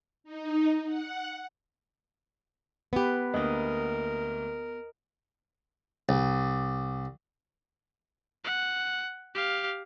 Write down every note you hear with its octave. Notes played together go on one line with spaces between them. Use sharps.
D#4
F#5
B3 G4 B4
D2 A#3 A#4 D#5
C2
F#5
G4 F5